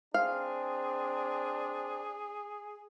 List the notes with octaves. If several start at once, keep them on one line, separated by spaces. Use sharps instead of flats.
C4 D4 G#4 F5